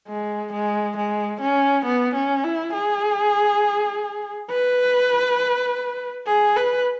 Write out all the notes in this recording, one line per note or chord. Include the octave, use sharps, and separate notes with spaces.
G#3
G#3
G#3
C#4
B3
C#4
E4
G#4
B4
G#4
B4